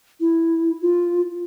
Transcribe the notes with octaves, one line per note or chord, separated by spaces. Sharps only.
E4
F4